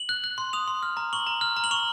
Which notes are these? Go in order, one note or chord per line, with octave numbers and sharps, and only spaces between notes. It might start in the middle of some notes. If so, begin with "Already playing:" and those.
Already playing: F#7
F#6
F#6
C6
D#6 F7
C6
F6
A#5
C#6 F#7
A#5
F6
A#5
F#7
C#6 F7